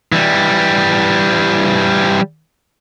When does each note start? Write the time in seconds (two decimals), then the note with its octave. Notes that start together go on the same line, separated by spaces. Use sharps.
0.12 E3 G3